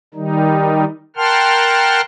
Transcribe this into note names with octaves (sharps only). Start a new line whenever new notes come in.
D#3 G3 D#4
A#4 F#5 G5 A5 C6 F6